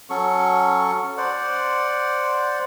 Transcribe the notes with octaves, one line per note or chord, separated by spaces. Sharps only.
F#3 C#4 A4 C#6
C5 D5 F#5